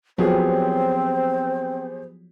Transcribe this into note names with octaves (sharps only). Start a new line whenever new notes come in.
F3 F#3 B3 C4 G4 G#4 C5